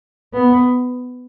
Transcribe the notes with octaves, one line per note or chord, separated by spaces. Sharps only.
B3